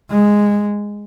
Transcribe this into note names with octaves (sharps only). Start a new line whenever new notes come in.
G#3